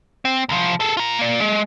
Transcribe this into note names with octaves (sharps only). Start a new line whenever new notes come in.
C4
C2 F3
G#4 A4
F4 A#5
A#3 D5
G#3